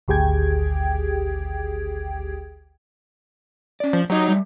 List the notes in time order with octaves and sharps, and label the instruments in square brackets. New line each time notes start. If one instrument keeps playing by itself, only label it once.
[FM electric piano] G#1 D2 G4 G#4 G5 G#6
[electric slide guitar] C#4 D5
[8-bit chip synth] F3
[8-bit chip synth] F#3 D#4 [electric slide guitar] G4 C#5 D#5
[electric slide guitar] G3 A3